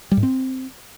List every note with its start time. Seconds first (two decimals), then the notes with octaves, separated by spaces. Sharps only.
0.11 G3
0.17 G#2
0.23 C4